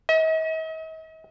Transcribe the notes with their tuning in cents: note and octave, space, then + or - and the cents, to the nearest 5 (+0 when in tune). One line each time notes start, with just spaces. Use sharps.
D#5 +45